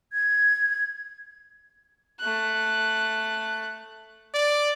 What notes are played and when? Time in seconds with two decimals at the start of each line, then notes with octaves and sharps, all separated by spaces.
0.13 G#6
2.20 A3 F#6
4.34 D5